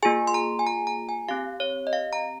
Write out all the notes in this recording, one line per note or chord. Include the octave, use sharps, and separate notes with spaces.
A#3 F4 G#4 G#5
C6
A#5
G#5
A#5
A#5
G#5
C4 G4 F5
C#5
D#5
F5
A#5